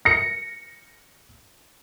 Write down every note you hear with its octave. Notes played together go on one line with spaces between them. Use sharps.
A#6 C#7